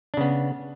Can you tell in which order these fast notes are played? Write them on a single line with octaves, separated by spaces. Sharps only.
D4 C#3 B3